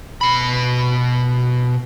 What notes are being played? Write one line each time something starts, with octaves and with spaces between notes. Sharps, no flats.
B2 B5